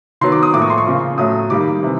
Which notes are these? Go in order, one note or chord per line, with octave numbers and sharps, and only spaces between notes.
D#3 F#3 B3 C6
D6
D#6
A2 F3 A#3 D6
C#6
C6
C#6
C#3 F3 A#3
A2 F#3 A3 D#6
D#3 G3 A#3 D6
C3 E3